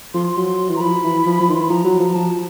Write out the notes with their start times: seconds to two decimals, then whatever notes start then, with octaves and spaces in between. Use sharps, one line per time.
0.14 F3 C6
0.33 F#3 C6
0.69 E3
0.76 A#5
0.80 F3 B5
1.04 E3
1.26 F3
1.40 F3
1.49 D#3 C6
1.55 E3
1.60 B5
1.70 F3 A#5
1.84 F#3
2.00 F3 A#5
2.14 F3 A5